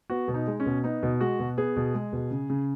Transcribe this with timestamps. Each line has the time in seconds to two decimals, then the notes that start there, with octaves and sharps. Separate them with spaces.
0.10 B3 F#4
0.28 B2
0.34 D#4
0.47 G#3
0.60 C#4
0.66 B2
0.84 B3 D#4
1.03 B2
1.21 G#3 F#4
1.39 B2
1.57 B3 G#4
1.76 B2
1.94 G#3
2.13 B2
2.31 C#3
2.50 C#3